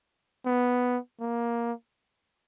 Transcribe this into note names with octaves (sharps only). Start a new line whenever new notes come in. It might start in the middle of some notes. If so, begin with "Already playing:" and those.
B3
A#3